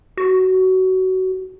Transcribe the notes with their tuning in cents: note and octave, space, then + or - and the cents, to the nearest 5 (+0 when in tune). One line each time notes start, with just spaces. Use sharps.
F#4 +20